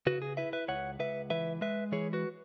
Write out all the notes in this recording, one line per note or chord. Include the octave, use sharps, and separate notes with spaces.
C#3 F#4 B4
G#4
E4 B4 E5
B4 E5
C#2 C#5 F#5
C#2 B4 E5
E3 B4 E5
G#3 B4 E5
E3 G#4 C#5
F#4 B4